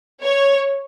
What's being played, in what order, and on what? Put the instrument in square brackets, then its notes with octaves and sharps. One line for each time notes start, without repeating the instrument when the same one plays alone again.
[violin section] C#5